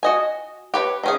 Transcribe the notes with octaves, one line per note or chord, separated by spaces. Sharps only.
F#4 D#5 G#5
G4 B4 C#5
D#3 C#4 G#4